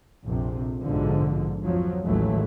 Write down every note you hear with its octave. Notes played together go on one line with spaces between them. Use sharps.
A#1 F2 C3
A#1 G#2 B2 D3 F3
F2 F3 F#3
A1 D#2 E3 F#3 G#3 A3